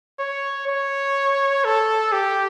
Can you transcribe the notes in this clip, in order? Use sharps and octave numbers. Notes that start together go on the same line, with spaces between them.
C#5
C#5
A4
G4